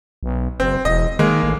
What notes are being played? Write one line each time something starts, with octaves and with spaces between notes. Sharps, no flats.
B1
F#1 C4
E1 D#5
D#3 G#3 A#3
A1